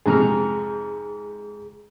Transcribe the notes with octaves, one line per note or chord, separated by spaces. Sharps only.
F2 G#2 C3 G#4 A#5 F6